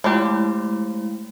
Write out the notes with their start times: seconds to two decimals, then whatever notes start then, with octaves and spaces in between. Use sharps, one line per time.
0.04 F3 G#3 A3 E4 G4